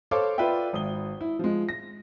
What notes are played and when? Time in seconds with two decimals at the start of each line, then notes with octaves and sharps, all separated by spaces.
0.11 A4 C5 C#5 F5 D6
0.38 F4 B4 D5 E5 G5
0.73 G#1 D#6 G7
1.21 E4
1.39 F3 G#3
1.69 A#6